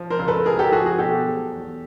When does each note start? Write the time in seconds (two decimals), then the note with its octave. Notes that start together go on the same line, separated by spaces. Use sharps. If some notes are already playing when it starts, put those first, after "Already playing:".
Already playing: F3
0.10 A#4 C5
0.19 C#2
0.28 A4 B4
0.46 C#2 G#4 A#4
0.59 G4 A4
0.72 F3 F#4 G#4
0.86 F#4 G#4
0.99 B2 G4 A4
1.26 F#3
1.52 E2